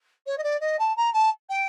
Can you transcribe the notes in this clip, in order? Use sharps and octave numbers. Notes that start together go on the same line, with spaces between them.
C#5
D#5
D5
D#5
A5
A#5
A5
G5